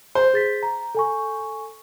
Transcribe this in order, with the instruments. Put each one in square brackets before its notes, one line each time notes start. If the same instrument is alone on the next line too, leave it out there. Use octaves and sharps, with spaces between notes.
[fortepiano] C5
[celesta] G#4 A6 B6
A#5
A4 G#5 C#6